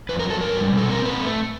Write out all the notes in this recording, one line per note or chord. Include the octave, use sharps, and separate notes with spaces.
F2 B4
A#4
F#3
A4
G#2 A#4
G3
B2 A4
C4 A#4
A#2 B4
A3